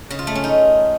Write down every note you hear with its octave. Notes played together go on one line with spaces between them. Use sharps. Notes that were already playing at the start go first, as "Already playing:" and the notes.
C#3
F4
A3
C#4
D#4